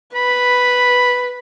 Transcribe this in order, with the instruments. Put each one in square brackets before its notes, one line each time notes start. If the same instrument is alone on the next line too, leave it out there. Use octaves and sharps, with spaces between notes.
[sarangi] B4 [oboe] B5